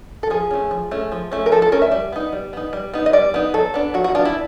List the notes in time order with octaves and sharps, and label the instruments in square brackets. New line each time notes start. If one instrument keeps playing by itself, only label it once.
[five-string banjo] A4
F3 G#4
A3 C#4
F3
A3 C#4
F3
A3 C#4
A#4
F3 A4
A4
A3 C#4 A#4
E5
G3
B3 D#4
G3
B3 D#4
G3
B3 D#4
D#5
G3 D5
B3 D#4
F#3 A4
B3 D4
F#3 F#4
F#4
B3 D4 F4
E4